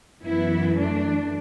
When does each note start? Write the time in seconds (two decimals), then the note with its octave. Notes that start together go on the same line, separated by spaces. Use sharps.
0.24 F#2 E3 B3 E4
0.77 A3 D4